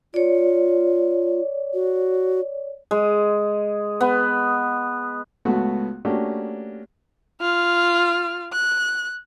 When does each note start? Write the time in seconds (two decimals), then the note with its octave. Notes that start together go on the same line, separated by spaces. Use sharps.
0.14 F4 C#5 D5
1.74 F#4
2.91 G#3
4.01 B3
5.45 C#2 A3 B3 F#4
6.05 A3 A#3 C#4 D4 F#4 G4
7.41 F4 F6
8.53 F#6